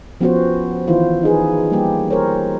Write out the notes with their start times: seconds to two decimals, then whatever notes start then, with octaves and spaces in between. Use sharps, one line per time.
0.21 F3 B3 C#4 F#4 G4 C5
0.88 D#3 E3 E4 F4 C5
1.23 D#4 G#4 B4
1.71 G3 A#3 G4
2.11 A#4 C5 C#5